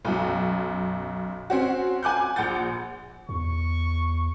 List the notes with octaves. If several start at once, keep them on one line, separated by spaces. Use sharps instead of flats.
B1 F#2
C4 C#4 F#4
G#5 D6 F#6 G6
A#1 F#5 G6 A6
E2 C#6